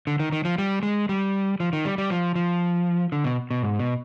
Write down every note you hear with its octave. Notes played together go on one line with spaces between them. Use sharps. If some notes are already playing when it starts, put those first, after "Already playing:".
D3
D#3
D#3
F3
G3
G#3
G3
F3
D#3
G3
G3
F3
F3
D3
B2
B2
G#2
B2